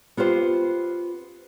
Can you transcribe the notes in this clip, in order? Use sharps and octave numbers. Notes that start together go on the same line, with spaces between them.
B3 F4 G4 C5